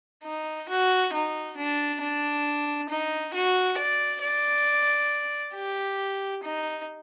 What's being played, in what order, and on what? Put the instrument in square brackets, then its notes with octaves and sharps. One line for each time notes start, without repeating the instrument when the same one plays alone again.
[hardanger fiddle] D#4
F#4
D#4
D4
D4
D#4
F#4
D5
D5
G4
D#4